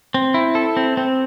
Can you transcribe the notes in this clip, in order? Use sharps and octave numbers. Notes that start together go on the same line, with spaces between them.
C4
E4
A4
C4
C4